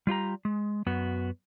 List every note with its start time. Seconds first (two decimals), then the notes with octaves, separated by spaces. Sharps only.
0.07 G3 F4 G4 A#5
0.45 G#3
0.86 F#2 B3 F#4